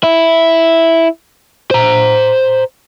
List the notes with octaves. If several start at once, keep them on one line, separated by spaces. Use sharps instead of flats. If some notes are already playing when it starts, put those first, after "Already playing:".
E4
C5 A#5